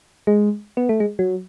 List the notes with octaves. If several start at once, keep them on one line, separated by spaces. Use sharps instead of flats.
G#3
B3
A3
G#3
F#3